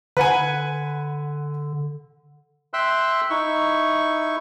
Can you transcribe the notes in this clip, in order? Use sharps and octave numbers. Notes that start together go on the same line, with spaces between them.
D3 B4 F#5 G#5
E5 G5 C6 E6 F#6
D#4 E4 C#6